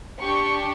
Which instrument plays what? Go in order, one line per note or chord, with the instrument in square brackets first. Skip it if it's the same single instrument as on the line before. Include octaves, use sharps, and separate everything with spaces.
[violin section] D4 G4 C#6